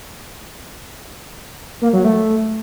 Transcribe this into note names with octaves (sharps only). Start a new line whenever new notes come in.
A#3
F#3
A3